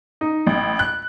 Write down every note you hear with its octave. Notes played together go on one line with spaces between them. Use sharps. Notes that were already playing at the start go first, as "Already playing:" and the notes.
D#4
A1
F#6